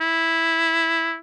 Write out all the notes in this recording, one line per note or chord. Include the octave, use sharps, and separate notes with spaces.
E4